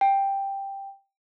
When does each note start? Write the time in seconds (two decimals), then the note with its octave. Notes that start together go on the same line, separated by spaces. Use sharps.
0.01 G5